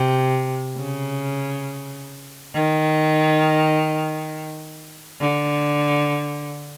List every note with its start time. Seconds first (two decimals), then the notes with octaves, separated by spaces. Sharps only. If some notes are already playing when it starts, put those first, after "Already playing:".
Already playing: C3
0.77 C#3
2.54 D#3
5.21 D3